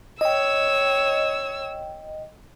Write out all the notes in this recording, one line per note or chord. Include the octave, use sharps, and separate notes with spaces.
C#5 D#5 G5 E6